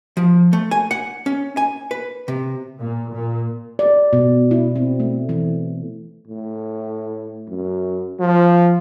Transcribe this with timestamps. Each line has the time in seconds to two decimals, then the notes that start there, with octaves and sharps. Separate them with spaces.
0.17 F3
0.53 A3
0.71 G#5
0.91 F#5
1.26 C#4
1.57 G#5
1.91 B4
2.28 C3
2.78 A#2
3.12 A#2
3.79 D5
4.13 B2
4.51 E4
4.76 C4
5.00 A3
5.29 E3
6.28 A2
7.48 F#2
8.20 F3